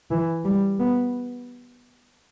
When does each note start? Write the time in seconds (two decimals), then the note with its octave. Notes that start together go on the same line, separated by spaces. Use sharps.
0.11 E3
0.45 G3
0.79 B3